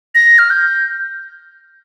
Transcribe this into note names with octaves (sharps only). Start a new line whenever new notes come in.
A#6
F6
G6